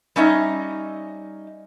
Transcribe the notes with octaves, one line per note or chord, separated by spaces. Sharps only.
G3 C#4 D#4 E5